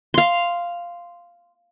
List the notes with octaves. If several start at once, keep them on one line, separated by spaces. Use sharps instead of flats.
F5 C6